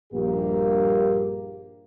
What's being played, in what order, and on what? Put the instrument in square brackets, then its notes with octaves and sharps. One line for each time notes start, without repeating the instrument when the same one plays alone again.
[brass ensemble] A#1 G2 A#3 G4